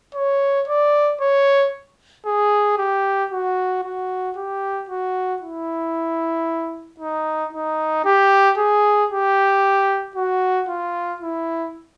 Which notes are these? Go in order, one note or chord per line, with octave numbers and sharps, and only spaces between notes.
C#5
D5
C#5
G#4
G4
F#4
F#4
G4
F#4
E4
D#4
D#4
G4
G#4
G4
F#4
F4
E4